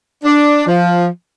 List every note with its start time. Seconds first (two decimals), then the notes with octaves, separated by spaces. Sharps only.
0.24 D4
0.67 F3